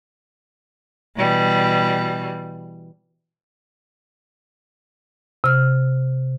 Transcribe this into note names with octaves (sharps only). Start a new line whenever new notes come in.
B2 E3 G3
C3 F6